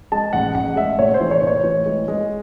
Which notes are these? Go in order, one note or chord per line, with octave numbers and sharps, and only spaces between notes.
G#3 A5
A1 F#5
A1 F#5
G#3 E5
A2 C#5
C5
E3
C#5
A2 C#5
E3
G#3
G#3